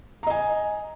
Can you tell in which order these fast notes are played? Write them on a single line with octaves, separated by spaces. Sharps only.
A#5 D#5 G#5